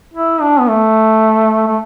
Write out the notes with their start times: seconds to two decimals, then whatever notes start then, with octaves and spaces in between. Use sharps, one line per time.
0.14 E4
0.41 D4
0.59 B3
0.69 A3
1.67 A3